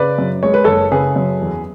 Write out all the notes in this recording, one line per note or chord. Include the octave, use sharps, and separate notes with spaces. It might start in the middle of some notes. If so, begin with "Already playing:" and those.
Already playing: C#3 B4 D5
F#2
G#3 C#5
B4
F#1 A4 C#5
C#3 G#4 B4
F#2
E2